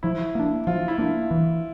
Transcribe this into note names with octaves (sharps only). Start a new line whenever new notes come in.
F3 E4
A#3 D4
F3 F4
E4
A#3 D4
E3